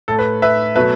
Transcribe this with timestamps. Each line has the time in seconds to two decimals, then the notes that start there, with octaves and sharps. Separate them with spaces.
0.08 A2 A3 A4
0.19 B4
0.42 B4 E5
0.76 B2 F#3 A3 B4 E5